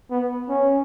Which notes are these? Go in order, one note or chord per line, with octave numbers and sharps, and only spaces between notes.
B3
C#4